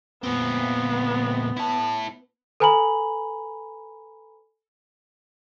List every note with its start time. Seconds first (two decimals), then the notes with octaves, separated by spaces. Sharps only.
0.24 A#2 B3 C4
1.57 E4 A5
2.60 A4 B4 G#5 A#5 B5 F#7